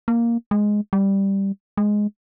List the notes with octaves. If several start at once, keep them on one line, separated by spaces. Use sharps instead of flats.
A#3
G#3
G3
G#3